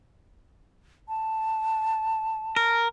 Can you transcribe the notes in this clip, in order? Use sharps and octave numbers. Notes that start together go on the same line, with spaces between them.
A5
A#4